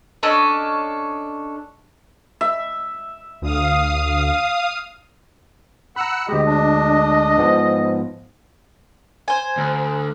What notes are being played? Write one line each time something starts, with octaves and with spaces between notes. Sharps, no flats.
C#4 D4 A4 D#5
E5
D2 F5 D#6
F#5 A#5 B5 E6 F#6
D2 G#3 G4 D#5
D4
G#2 F3 B3
C5 G#5
D2